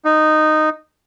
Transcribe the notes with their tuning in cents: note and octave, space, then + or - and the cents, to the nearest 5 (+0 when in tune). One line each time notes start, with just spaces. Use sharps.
D#4 -10